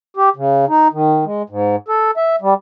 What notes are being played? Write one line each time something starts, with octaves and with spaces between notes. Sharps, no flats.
G4
C#3
D#4
D#3
G#3
G#2
A4
E5
G3